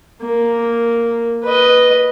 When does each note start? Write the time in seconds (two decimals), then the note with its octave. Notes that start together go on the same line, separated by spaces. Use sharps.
0.21 A#3
1.43 B4 D#5